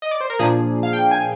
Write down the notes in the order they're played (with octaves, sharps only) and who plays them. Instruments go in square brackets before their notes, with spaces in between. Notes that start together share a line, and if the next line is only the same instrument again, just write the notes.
[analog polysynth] D#5
D5
C5
A#4
A#2 F3 A#3 D4 G#4
F5
G5
G#5